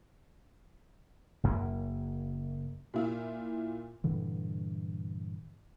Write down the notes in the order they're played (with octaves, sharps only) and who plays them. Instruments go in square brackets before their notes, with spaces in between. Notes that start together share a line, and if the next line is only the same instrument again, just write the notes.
[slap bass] F#1 F#2 A#3
[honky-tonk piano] A#2 E4 F4
[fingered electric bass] G2 A#2 D3 E3